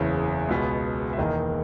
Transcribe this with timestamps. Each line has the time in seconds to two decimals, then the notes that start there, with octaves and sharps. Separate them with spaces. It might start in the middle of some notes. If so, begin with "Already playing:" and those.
Already playing: F#1 E2 C#3 E3
0.49 C#2 B2 G#3 B3
1.13 E5
1.18 E1 E2 D#3 A#3 D#5